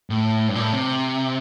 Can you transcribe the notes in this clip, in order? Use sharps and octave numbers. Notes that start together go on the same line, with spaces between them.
A2
G2
A#2
A2
C3